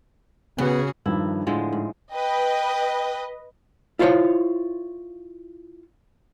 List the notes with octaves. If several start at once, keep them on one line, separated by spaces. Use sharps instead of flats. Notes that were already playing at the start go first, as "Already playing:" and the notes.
C#3 B3 F#4 G#4
G2 D#3 F3 E4
A2 D3 F3 G#3
G#2
B4 D#5 G5
E4 F4 C5 C#5 F5